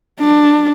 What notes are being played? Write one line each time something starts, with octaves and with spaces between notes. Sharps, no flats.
D4